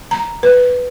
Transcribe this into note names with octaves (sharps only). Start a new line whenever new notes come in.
A#5
B4